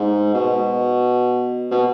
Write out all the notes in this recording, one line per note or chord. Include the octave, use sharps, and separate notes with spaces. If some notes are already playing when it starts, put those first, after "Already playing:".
Already playing: G#2
B2
B2